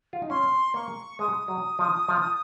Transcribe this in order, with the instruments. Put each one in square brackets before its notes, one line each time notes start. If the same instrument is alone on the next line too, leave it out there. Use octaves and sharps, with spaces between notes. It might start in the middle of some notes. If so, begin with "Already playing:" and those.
[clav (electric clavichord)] F4
D#4
[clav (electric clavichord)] C#4 [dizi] C6
[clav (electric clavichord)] A#3 [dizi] C#6
[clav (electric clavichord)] G#3 [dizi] D#6
[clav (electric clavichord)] F#3
F3
F3